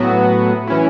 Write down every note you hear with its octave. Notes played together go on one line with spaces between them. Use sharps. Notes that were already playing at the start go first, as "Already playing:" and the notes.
Already playing: A2 F#3 B3 F#4
E3 C#4 E4